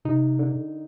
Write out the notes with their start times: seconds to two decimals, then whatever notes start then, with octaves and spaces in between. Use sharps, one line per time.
0.05 C3 D#4
0.39 D3